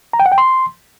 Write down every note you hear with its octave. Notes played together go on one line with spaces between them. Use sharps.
A#5
G5
F#5
G5
C6